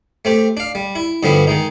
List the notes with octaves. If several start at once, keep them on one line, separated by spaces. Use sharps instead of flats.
A3 C4 G4
D4 F5
G3
E4
G2 D3 F3 G3 B3
D#3 G#3 D#4